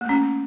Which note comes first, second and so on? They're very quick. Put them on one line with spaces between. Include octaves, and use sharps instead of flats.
A#3 A3 C#4